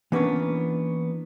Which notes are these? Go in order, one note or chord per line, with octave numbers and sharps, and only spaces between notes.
E3 A#3 B3 C#4 D4